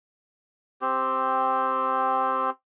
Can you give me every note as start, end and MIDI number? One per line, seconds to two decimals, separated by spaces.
0.82 2.50 60
0.82 2.50 67